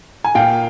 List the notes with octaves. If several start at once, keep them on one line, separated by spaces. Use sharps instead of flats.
G#5
A#2 F5 G5